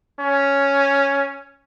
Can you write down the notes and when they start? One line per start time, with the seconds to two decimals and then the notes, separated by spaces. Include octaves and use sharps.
0.21 C#4